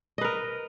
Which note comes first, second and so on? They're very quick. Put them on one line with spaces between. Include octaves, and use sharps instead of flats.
D#5 B4 A#4